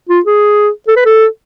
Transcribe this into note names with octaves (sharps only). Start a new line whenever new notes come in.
F4
G#4
A4
B4
A4